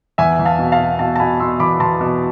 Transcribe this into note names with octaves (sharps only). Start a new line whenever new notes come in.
E2 E5 G#5
E2
F5 A5
B2
F5 A5
B2
B2 F5 A5
A5
B2 G#5 B5
B2 C6 E6
E2 B5 D6
E2 A5 C6
B2